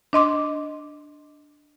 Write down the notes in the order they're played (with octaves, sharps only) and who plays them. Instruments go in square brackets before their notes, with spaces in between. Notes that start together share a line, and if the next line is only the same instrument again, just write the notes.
[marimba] D4 D#5 C6 D6